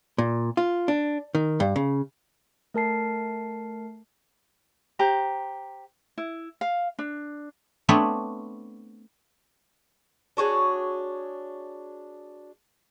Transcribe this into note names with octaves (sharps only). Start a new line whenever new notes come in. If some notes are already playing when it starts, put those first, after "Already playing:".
A#2
F4
D4
D#3
G2
C#3
A3 A#4 A5 C7
G4 C5 A#5
E4
F5
D4
A3 B3 C4 D4 B4 C#5
D4 F#4 G#4 C#5